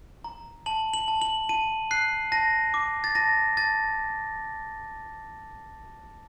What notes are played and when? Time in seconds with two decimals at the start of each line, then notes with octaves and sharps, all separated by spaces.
0.24 A#5
0.66 A5 F#7
0.94 F#7
1.08 A5
1.21 F#7
1.49 A5 D#7
1.91 F#6 C7
2.32 A5 A#6
2.74 D6
3.04 A6
3.15 A5 A#6
3.57 A5 A6